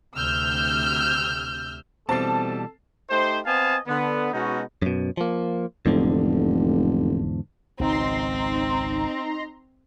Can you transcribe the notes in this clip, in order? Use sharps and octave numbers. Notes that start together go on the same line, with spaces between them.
D2 C3 E6 F6 G6
B2 E3 G3 C4 A4 A5 A6 C7
A3 D#4 G4 C5
B3 C4 D#5 F5 G#5 A5
D3 B3
B2 G#3 B3 C#4 D#4 F#4
F#2 B2
F3 A#3
F1 E2 G#2 D3
G#1 C#2 C4 D#4 A#5 C6